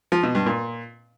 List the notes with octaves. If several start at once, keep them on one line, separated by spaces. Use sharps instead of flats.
F3
B2
G2
A#2